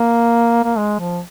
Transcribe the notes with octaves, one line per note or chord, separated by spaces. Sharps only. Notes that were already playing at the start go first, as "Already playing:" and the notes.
Already playing: A#3
A#3
G#3
F3